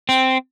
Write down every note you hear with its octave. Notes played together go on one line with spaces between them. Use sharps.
C4